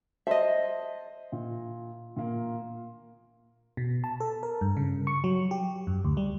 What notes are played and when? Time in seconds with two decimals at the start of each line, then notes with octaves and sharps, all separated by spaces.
0.27 C5 D#5 E5 A5 C6
1.32 A#2
2.16 A#2 A#3
3.77 B2
4.04 A5
4.20 A4
4.43 A#4
4.61 G2
4.77 C#3
5.07 C#6
5.24 F#3
5.51 G4
5.87 F#2
6.05 D2
6.17 G3